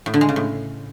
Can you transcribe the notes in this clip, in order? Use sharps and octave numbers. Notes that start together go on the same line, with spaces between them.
A2
D3
G#3
C#3
A2